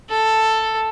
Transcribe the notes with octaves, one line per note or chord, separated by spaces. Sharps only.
A4